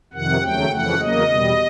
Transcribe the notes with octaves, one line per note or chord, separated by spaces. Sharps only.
F2 C3 D#3 F#5
D#2 C#3 F#3 A3 G5
F2 C#3 E3 A3 F#5
E2 C#3 F#3 A#3 D#5
E2 B2 G3